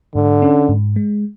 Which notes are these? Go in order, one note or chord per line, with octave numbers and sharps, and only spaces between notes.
G#2 D3
C#4
G#2
G#3